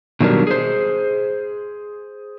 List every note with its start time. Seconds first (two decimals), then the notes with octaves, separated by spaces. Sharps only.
0.20 B2 D#3 F#3 G3 D4 A#4
0.47 G#4 C5